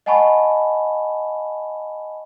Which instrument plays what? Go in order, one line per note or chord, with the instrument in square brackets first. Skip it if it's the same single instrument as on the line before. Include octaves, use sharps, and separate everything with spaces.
[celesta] D#5 F#5 G#5 A5 B5 C#6